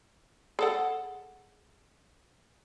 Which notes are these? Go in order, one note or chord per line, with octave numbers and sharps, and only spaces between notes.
G#4 A4 F#5